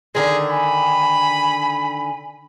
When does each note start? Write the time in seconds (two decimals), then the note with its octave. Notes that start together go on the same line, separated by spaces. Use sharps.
0.15 D3 D#3 G#3 G#4
0.51 G#5 B5